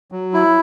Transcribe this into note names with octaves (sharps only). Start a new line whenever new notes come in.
F#3
E4